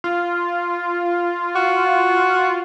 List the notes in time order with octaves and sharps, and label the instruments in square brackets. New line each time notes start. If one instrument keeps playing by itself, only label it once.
[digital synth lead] F4
[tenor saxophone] F#4